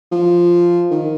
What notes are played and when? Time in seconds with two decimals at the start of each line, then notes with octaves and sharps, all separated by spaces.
0.12 F3
0.91 D#3